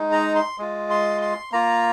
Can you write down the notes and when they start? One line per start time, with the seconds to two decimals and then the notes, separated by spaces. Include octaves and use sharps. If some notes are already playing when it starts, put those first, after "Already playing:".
Already playing: G#3 D#4
0.12 A#5
0.35 C6
0.58 G#3 F4
0.90 C6
1.22 C6
1.52 A#3 F4 A#5